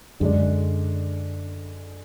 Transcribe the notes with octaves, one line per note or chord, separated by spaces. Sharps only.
F#2 D3 G#3 D4